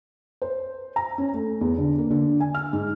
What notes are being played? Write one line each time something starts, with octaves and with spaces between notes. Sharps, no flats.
C5
A#5
C#4
A3
E2
D3
A#3
D3
G#5
F6
G#2